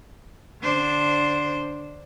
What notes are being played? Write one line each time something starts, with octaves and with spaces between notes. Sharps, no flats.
D3 D4 C5